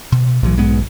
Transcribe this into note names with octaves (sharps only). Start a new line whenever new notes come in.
B2
B1 A2 E3 F#3
G#2 G#3 B3